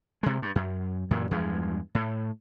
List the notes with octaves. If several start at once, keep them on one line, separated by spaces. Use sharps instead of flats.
C3 G#3
G2
F#2
F#2 A#2 E3
E2 G2 F3 G#3
A2